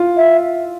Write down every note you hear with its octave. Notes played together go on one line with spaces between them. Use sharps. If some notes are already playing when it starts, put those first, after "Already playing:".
Already playing: F4
E5